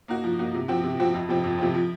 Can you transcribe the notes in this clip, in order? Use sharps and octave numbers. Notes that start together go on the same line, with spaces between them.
A#3 D#4 F#4
F3
A#3 D#4 F#4
C3
F3 C4 F#4
C3
F3 C4 F#4
F2
C3 F3 C4
F2
C3 F3 C4
F3